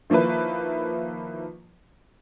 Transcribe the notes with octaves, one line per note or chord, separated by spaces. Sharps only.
D#3 F3 A#3 E4 B4